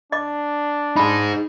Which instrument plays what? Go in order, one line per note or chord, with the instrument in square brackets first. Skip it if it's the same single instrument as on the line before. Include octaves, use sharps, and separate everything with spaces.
[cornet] D4 [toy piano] D#5 D6
[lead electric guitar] D#4 G#4 [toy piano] B5